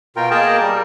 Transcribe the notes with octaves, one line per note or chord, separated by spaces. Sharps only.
B2 F4 A#4 G5
A#3 G#4 A#4 D#5 G5 A5
G3